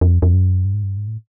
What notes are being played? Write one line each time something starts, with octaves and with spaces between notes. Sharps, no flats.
F2
F2
F#2
G2
G#2
G2
G#2
A2